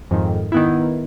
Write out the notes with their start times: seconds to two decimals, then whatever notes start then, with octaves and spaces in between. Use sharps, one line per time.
0.11 F2 G#2 D#3
0.52 D#3 B3 E4